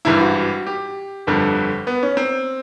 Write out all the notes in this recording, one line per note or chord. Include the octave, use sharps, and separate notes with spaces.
G#1 G2 E3 G3 E4
F#4
G4
G1 F2 D3 G3
B3
C#4
C4